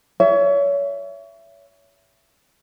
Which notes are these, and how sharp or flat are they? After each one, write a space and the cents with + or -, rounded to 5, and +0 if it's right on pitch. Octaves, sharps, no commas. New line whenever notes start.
C#5 +30 E5 +20